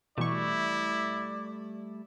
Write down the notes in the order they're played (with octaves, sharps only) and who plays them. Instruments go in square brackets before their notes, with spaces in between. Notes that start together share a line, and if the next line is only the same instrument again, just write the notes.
[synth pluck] B2 E3 C#6 [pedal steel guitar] G3 A3 [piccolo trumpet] E4 [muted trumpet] D5